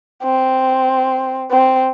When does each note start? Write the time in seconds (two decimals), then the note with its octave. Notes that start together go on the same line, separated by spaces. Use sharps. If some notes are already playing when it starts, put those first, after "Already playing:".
0.24 C4
1.51 C4